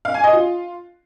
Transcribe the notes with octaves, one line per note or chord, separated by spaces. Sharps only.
F5
G#5
D#5
F4